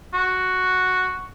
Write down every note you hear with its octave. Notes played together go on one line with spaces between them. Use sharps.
F#4